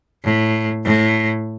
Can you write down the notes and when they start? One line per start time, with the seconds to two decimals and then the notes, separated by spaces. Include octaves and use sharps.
0.24 A2
0.85 A2